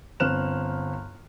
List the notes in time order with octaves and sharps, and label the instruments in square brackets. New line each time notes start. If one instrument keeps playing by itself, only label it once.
[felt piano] G1 C4 F6 F#6 E7